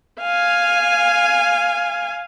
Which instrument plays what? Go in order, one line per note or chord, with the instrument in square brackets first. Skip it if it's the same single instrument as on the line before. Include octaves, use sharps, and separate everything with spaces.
[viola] F5 G#5